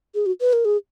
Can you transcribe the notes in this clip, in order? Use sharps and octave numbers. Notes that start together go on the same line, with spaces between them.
G#4
F#4
B4
A#4
G#4